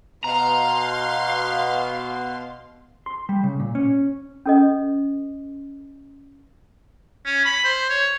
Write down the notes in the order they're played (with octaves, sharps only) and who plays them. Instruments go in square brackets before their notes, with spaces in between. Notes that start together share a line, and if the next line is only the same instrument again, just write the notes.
[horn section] B2 [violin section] F5 C6 [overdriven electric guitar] A#5
[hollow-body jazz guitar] C6
G3
C#3
A#2
C#4
[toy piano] C#4 A4 D#5
[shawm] C#4
B5
C5
C#5